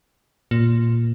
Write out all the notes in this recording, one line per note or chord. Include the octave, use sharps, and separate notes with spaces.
A#2